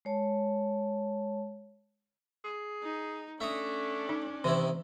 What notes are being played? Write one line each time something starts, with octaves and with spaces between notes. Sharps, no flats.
G#3 C#5 A5
G#4
D#4
A3 C#4 D4 E5 A#5 D#6
D#4
C3 D#3 E3 E4